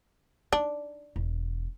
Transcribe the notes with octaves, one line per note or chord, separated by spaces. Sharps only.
D4 D#4
E1